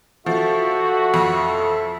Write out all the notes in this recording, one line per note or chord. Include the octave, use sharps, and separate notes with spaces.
F3 F#4 A4 E5
F2